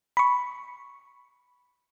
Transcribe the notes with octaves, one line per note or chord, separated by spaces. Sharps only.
B5 C#6